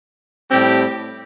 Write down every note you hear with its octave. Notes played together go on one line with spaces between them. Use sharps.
A2 G3 C4 G4